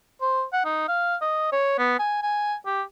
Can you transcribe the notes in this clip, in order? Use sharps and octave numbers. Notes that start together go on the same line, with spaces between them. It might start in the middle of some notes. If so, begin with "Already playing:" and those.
C5
F#5
D#4
F5
D#5
C#5
B3
G#5
G#5
G4